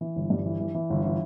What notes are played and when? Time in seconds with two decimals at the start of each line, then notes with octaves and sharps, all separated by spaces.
0.01 E3
0.16 G1
0.30 G2
0.46 E3
0.60 E3
0.74 E3
0.90 G1
1.05 E3